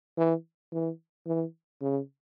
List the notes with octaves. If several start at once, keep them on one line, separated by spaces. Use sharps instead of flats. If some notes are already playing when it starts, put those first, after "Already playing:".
E3
E3
E3
C#3